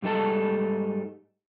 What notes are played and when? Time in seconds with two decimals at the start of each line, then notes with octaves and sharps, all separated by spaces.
0.02 G#2 G3 D#4 A4 A5